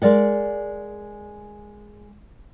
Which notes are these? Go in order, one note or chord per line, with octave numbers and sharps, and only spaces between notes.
G#3 A#4 D5 F#5